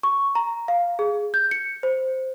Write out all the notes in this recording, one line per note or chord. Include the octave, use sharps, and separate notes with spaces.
C#6
A#5
F5
G#4
G6
C#7
C5